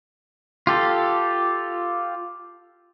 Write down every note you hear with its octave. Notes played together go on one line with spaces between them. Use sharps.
F4 G4 A4